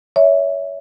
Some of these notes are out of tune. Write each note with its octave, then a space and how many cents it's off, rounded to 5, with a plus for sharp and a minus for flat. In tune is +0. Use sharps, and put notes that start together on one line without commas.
C#5 +25 E5 -10